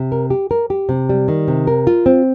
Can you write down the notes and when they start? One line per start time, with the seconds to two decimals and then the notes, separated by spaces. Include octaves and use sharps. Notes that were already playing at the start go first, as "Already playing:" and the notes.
Already playing: C3
0.12 A#4
0.30 G4
0.51 A#4
0.70 G4
0.89 C3
1.09 G3
1.28 D#3
1.48 C3
1.67 A#4
1.87 F4
2.06 C4